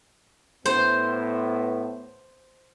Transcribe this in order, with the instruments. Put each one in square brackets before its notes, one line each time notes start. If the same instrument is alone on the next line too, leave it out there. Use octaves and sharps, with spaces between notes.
[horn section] A2 B3 [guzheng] C5